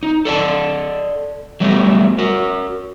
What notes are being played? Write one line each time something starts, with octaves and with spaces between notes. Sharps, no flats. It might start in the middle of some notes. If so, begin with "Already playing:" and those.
D#4
A4 D5 D#5 A5
F#3 G3 A3 B3 G4
F#4 A#4